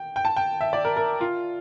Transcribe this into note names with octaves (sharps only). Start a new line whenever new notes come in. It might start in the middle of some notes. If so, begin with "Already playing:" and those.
Already playing: G5
G5
A5
G5
E5
D5
A#4
A#4
F4